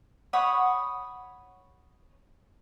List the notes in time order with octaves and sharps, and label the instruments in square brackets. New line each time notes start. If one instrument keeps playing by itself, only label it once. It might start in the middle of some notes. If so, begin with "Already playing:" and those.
[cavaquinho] C#5 F#5 B5 D#6